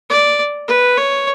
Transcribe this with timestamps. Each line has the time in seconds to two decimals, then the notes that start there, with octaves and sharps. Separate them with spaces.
0.10 D5
0.68 B4
0.97 C#5